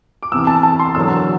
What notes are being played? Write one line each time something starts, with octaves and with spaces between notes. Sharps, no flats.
D6
E2 C3 E3 E6
A5
A5
C6
E1 E2 D3 F#3 E6